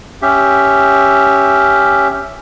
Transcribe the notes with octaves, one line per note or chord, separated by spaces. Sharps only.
C#4 G4 E5